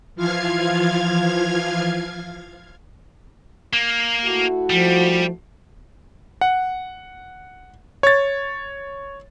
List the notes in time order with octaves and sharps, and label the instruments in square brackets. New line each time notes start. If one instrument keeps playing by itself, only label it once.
[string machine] E3 F3 F4 F5 F6 G#6
[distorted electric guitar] A#3
[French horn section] A3 E4 F#4
[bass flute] F3 [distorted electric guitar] G3
[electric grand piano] F#5
C#5 A6